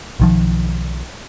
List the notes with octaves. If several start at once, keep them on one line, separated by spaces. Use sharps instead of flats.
B1 D#3 F3